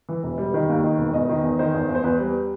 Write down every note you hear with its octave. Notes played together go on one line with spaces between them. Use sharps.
E3
E1
G3
D#3
D#2
D#3
E1
E2 D#5
D#3
E2
D#3 C5
E2
E2
C5
E2 B4
G3